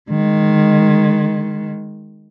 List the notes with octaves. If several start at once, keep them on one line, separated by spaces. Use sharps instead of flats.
D#3 G#3